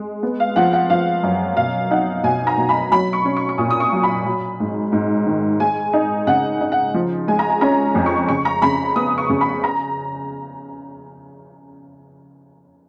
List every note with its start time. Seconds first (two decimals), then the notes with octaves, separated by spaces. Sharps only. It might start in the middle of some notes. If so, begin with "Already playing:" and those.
Already playing: G#3
0.23 B3
0.40 F5
0.56 F3 F#5
0.73 F#5
0.90 F3 F5
1.23 F#2
1.57 B2 F5
1.91 D#4 F#5
2.23 B2 G#5
2.47 A#5
2.58 B2
2.69 B5
2.92 F#3 B5
3.13 C#6
3.25 C#4
3.37 C#6
3.49 C#6
3.58 A#2 D#6
3.71 D#6
3.80 C#6
3.92 F#3
4.03 B5
4.26 F#3
4.60 G#2
4.92 G#2
5.26 D#3
5.59 G#3 G#5
5.93 D#4
6.27 C#3 F#5
6.61 D#4
6.72 F#5
6.94 F3
7.27 G#3 G#5
7.39 A#5
7.50 G#5
7.61 C#4 A#5
7.95 F2
8.06 C#6
8.29 C#3 C#6
8.45 A#5
8.62 C#3 B5
8.96 B3 D#6
9.18 C#6
9.30 C#3
9.41 B5
9.64 A#5